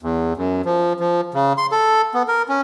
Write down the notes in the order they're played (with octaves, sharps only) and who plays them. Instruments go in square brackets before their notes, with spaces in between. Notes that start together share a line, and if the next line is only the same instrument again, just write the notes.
[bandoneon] E2
F#2
F3
F3
C#3
C6
A4
B3
A#4
C#4